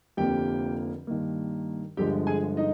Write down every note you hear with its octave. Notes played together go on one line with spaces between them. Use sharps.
F1 F2 D3 F3 A#3 G4 G5
G2 D#3 A#3
G1 G2 D3 F3 G#3 G4 G5
G#4 G#5
D#4 D#5